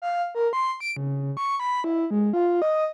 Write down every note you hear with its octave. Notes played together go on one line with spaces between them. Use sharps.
F5
A#4
C6
D7
C#3
C#6
B5
E4
G#3
F4
D#5